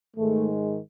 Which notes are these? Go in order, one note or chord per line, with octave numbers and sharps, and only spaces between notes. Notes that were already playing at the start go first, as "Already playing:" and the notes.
G#2 D#3 G#3 A3